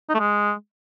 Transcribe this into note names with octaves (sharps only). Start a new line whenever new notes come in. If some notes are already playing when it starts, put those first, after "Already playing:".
D#4
A3
G#3